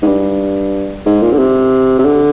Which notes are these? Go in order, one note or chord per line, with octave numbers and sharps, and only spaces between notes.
G#2
G2
G#2
A#2
D3
C3
C3
D3